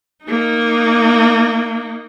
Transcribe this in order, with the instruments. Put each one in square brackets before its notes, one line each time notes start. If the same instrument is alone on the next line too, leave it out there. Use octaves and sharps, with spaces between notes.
[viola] A#3 D#4